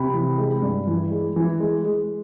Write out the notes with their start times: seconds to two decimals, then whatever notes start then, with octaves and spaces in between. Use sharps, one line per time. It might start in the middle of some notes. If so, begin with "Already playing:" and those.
Already playing: C3 B5
0.14 E3
0.38 G#3
0.62 G2
0.87 E3
1.11 G#3
1.36 E3
1.60 G#3
1.85 G#3